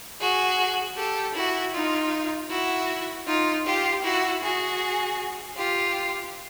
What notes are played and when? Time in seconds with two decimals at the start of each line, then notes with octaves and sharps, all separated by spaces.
0.20 F#4 G#4
0.96 G4 A4
1.34 E4 F#4
1.73 D#4 F4
2.49 E4 F#4
3.26 D#4 F4
3.65 F4 G4
4.03 E4 F#4
4.41 F#4 G#4
5.56 F4 G4